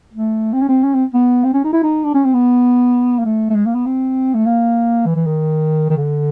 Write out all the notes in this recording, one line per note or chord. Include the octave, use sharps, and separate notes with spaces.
A3
C4
C#4
C4
C#4
C4
B3
C4
C#4
D#4
E4
D#4
D4
C#4
C4
B3
A#3
A3
A3
G#3
A#3
B3
C4
A3
A#3
E3
E3
D#3
D#3
D3